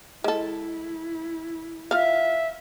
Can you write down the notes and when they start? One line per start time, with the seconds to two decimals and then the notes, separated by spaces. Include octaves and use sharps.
0.24 G#3 E4 A4
1.91 F4 E5 F5